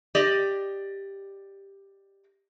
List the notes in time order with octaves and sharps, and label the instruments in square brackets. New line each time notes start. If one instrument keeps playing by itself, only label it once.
[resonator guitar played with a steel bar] G4 D5 D#5